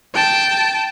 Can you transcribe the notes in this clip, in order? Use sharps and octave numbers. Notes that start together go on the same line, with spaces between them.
G5 A5